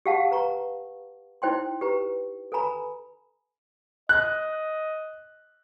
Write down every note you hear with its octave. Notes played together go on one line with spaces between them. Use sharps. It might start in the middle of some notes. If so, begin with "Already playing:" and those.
G4 G#4 F5 F#5 A5
B4 A#5 C#6
D#4 E4 C5 G5 C6
G4 B4 A#5
A4 B4 G#5 A#5 B5
D#5 F#6